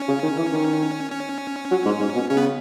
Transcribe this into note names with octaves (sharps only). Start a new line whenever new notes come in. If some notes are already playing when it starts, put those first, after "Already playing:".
Already playing: C#4
C#3
D#3
E3
D#3
C#4
F#3
G#2
G#2
B2
C#3 C#4
B3